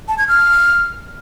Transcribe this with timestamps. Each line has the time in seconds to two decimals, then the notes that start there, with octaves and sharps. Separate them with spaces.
0.08 A5
0.18 G#6
0.28 F6